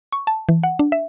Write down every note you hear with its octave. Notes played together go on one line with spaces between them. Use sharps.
C#6
A5
E3
F#5
D4
E5